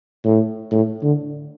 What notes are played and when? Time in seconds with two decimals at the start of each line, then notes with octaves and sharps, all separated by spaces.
0.25 A2
0.72 A2
1.03 D3